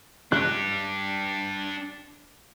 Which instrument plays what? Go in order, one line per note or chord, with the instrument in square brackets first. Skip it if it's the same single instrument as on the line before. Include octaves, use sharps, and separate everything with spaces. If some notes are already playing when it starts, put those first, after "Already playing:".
[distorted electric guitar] D4 G4 [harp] F#6